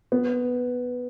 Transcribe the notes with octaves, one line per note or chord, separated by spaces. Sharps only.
B3